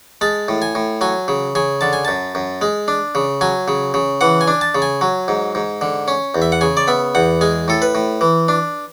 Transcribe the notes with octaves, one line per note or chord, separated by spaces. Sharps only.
G#3 A5
A2
G#5
A2
F#3 G#5
C#3
C#3 G#5
D3 A5
G#5
F#2 A5
F#2
G#3
D4
C#3
F#3 G#5
C#3
C#3
E3 F#5
G#5
D4
A5
C#3
G#5
F#3
G#2
G#2
D3
C#4
E2
E5
F#5
C#3 G#5
D5
B3 E5
E2 F#5
G#3 G#5
A2 A4
B4
A2
E3
D4